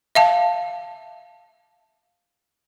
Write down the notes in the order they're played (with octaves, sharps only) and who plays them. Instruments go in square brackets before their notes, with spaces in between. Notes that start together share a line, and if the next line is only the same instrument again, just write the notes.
[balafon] E5 F5 A5